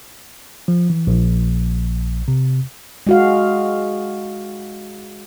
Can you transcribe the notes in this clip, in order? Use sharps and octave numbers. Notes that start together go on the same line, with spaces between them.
F3
E3
A#1
C3
G#3 F#4 F5